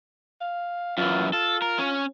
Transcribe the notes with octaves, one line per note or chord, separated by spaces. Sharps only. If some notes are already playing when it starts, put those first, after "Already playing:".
F5
F#2 E3 F4
F4 A4
A#4
C#4